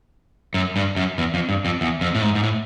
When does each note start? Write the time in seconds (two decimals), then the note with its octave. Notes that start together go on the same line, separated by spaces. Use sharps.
0.54 F#2
0.76 G2
0.96 F#2
1.18 E2
1.34 F2
1.49 G2
1.65 F2
1.81 E2
2.01 F2
2.15 A2
2.22 G#2
2.35 G#2
2.43 A2